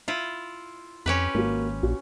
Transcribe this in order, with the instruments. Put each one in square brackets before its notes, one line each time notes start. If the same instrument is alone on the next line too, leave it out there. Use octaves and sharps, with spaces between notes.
[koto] E4 F4
[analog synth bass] F2 [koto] C#4 G4 B4
[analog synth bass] G#1 [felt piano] A#3 F#4
[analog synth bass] A#1 [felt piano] F#4